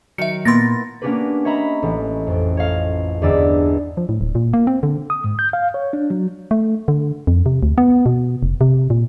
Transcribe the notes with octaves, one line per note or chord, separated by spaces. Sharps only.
D#3 F#3 E5 C#7
A#2 A#3 B3 E4 C6 A6 A#6
A#3 B3 C#4 D4 G4 B4
C#5 D#5 E5 A#5 B5
A1
F2 G5
C#5 D#5 F5
G1 E2 D4 D5 D#5 E6
F3
A2
D1
A#2
A#3
C4
D3
D#6
G#2
G6
F5
C#5
D4
F#3
A3
D3
F2
C3
D2
B3
B2
F1
C3
A#2